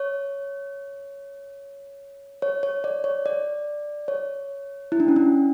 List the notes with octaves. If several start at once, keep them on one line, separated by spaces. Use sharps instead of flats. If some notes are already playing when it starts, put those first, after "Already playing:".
Already playing: C#5
C#5
C#5
D5
C#5
D5
C#5
E4
D4
C#4
D4